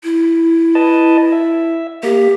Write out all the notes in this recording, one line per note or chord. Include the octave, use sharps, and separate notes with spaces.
E4
B4 D#5 A5
E5
A#3 G4